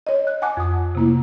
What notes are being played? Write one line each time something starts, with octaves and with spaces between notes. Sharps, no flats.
C#5 D#5
F#6
F#5 G#5 A5 D6 F#6
F2 D#6
C3 A3 A#3 E4